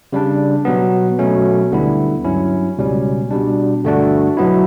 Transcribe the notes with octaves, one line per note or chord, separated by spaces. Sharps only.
C#3 G3 D4
B2 F#3 B3
B2 F#3 A3 C#4
D2 D3 G3 B3 E4
G2 F#3 C#4 E4
C#2 B2 G3 C#4
B2 G3 D4
G2 D3 A3 D4 F#4
B1 B2 F#3 B3 E4